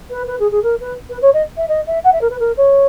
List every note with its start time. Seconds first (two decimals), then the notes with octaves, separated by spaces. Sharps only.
0.10 B4
0.28 B4
0.40 G#4
0.51 G#4
0.63 A#4
0.81 B4
1.10 B4
1.22 C#5
1.34 D#5
1.57 E5
1.69 D#5
1.87 E5
2.04 F#5
2.13 E5
2.21 A#4
2.30 B4
2.40 A#4
2.57 C#5